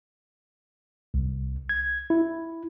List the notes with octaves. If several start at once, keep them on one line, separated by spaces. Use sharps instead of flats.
C2
G#6
E4